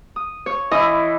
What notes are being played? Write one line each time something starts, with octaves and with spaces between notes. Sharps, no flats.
D#6
C#5
E3 E4 D#5